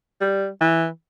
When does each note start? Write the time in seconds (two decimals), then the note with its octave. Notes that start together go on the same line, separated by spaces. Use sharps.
0.21 G3
0.61 E3